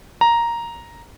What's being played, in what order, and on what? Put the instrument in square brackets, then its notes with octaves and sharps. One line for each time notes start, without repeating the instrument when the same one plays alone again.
[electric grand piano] A#5